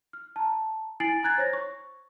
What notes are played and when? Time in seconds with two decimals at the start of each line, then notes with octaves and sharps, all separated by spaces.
0.13 F6
0.36 A5 A#5
1.00 E4 G#5 A6 C7 D7 F#7
1.23 G#5 A#5 F#6 G#6 A6
1.38 C5 C#5 A#6
1.53 C#6